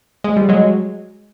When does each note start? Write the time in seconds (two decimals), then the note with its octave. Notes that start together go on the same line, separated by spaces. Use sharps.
0.24 G#3
0.36 G3
0.49 F#3 G#3